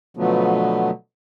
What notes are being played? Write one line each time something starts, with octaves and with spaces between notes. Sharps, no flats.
B2 D3 F3 F#3 A3 B3